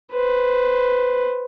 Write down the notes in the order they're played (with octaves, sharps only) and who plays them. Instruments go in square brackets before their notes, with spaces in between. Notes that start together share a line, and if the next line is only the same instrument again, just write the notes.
[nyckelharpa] B4 C5